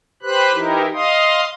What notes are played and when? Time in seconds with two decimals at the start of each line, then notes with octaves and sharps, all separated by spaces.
0.22 G4 B4 C5 B5 F#6
0.53 E3 D#4 E4 G4 A#4
0.94 D#5 F5 C6 D#6